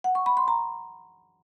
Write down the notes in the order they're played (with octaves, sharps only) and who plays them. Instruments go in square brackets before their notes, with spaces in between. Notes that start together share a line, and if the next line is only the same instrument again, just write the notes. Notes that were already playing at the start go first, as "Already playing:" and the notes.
[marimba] F#5
C#6
B5
C6
A#5